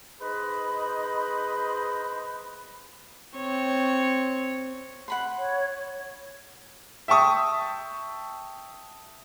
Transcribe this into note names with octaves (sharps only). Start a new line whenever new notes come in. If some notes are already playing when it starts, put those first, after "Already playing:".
D#4 G#4 B4 C5 D#5 B5
C4 C#5
F#5 B5 C6
C#5
E5 G5 A5 C#6 D#6